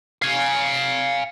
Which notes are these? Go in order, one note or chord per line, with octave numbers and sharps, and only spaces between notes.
F5 G#5